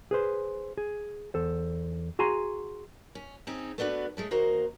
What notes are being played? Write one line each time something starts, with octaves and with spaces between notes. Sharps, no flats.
G#4 B4 C5
G#4
E2 A4 C5
F#4 G#4 G#5 A#5 C6
C#4
C4 C#4 D#4 G#4
A3 B3 D4 F#4 B4
G#3 A3 C#4
D#2 A#3 F#4 C5 D#5 A#5